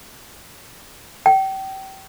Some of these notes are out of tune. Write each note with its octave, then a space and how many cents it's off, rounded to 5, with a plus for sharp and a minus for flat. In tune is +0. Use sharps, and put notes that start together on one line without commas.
G5 -30